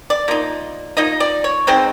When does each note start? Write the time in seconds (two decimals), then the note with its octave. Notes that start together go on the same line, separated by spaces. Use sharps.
0.10 D5
0.28 F3 A#3 D#4
0.97 F3 A#3 D#4 D#5
1.20 D5
1.44 C#5
1.67 B2 G#3 C4 D#4 C5